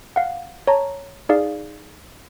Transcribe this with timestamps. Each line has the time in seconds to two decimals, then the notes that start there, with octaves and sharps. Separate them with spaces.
0.16 F5 F#5
0.67 C#5 A5 A#5
1.29 D#4 G#4 D5 F5